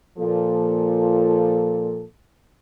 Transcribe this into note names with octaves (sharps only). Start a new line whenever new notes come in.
A#2 F3 A4